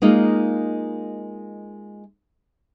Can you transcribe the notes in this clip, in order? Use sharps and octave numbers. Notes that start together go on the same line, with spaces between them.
G#3 A#3 D#4 F4